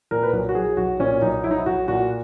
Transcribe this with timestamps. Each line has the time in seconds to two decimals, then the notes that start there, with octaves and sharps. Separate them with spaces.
0.11 A#2 A#4
0.23 B4
0.33 B1 A#4
0.49 F#4
0.55 F#3 G#4
0.77 B1 F#4
1.00 A#2 C#4
1.22 B1 D#4
1.44 F#3 E4
1.51 D#4
1.58 E4
1.66 B1 F#4
1.88 A#2 F#4